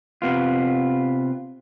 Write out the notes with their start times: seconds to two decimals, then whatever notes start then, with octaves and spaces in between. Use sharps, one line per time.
0.22 C3 B3 F4